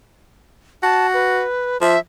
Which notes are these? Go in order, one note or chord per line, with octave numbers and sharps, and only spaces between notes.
F#4 A5
B4
F3 E5